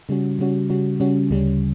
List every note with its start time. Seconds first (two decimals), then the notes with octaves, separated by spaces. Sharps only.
0.09 C#3 G3 C#4 F#4
0.39 C#3 G3 C#4 F#4
0.70 C#3 G3 C#4 F#4
1.00 C#3 G3 C#4 F#4
1.30 D2 C#3 G3 C#4